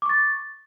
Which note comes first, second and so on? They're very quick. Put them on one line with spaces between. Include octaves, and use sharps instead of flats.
D6 C#6 A6